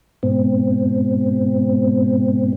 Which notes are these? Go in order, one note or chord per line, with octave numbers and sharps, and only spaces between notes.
G#2 B2 C4